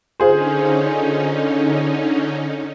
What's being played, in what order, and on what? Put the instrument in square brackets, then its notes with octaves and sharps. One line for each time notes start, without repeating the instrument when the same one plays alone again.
[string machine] D3 C#4 D#4 [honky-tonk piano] F4 G#4 C5